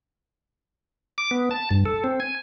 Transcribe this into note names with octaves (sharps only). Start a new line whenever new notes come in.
D6
B3
A5
G2
A4
C4
G#5